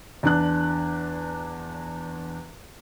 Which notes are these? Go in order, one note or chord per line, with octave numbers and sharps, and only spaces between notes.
E2 D4 F#6